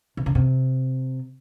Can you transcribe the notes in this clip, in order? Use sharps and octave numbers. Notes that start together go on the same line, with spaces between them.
C3
C#3
C3